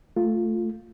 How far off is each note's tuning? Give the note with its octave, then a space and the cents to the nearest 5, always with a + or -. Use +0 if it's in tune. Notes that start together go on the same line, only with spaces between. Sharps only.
A3 +0 F4 +0